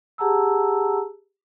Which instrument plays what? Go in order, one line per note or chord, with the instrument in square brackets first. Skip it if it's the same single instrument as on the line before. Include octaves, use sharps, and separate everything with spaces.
[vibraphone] G4 G#4 F#5 A5 A#5 E6